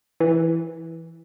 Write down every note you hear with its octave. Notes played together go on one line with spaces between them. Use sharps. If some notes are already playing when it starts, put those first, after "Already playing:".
E3